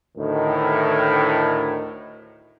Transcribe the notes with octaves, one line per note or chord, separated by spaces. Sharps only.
D2 A2 D#3